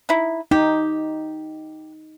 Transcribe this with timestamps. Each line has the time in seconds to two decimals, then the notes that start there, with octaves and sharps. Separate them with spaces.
0.09 D#4 E4
0.51 D#4 G4